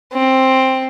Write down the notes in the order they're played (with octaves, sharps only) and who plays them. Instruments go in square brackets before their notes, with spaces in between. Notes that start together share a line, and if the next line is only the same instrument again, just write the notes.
[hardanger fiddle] C4